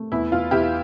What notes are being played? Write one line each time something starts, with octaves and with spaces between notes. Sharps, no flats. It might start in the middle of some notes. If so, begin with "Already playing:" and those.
Already playing: A3
E2 E4
E2 F4
E2 E4 G4